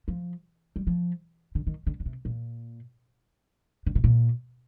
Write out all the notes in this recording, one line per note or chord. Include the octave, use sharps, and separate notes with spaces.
F3
G3
F3
D3
D#3
D3
D3
C3
A#2
D3
C3
A#2